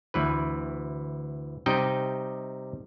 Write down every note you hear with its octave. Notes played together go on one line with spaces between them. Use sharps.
D2 E3 B4
C3 G3 D#4 D#5 G5